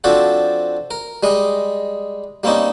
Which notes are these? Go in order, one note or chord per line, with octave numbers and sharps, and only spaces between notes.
F3 C4 D4 F#4 A4
A#4
G3 G#3 D#5
G3 A#3 C4 C#4 D#4